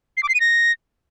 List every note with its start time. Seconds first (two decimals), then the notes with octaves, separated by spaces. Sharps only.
0.17 C7
0.23 D6
0.29 C7
0.35 D#7
0.40 A#6